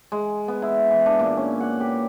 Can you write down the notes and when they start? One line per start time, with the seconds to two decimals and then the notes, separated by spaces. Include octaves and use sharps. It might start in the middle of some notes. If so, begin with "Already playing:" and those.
0.12 G#3
0.48 B3
0.62 E4
0.91 E3
1.06 D4
1.19 A#2
1.37 C#4
1.60 F#5
1.80 G4